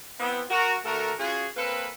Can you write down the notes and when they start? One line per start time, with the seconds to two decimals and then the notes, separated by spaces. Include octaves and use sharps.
0.19 B3 C4 E4
0.49 F#4 A#4
0.84 D3 A3 F#4 A4 A#4
1.19 C#4 F4 F#4 G#4
1.56 A#3 C4 A4 B4